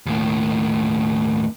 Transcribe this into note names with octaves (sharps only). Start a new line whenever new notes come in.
D#2 A2